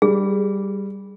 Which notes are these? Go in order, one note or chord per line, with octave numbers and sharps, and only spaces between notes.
G3 G#4